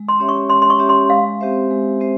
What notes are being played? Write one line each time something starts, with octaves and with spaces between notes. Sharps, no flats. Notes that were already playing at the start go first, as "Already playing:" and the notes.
Already playing: G#3
C6
C#4 G4 C#5 E5
C#6
G#3 C6
C6
C#6
C#4 G4 C#5 E5
C6
G#3 F5
C4 G4 C5 E5
G#3
C4 G4 C5 E5